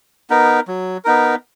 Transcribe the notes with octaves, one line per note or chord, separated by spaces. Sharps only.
B3 D#4 A#4
F#3
B3 D#4 A#4